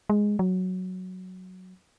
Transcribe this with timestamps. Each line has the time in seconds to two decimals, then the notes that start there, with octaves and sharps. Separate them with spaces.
0.10 G#3
0.39 F#3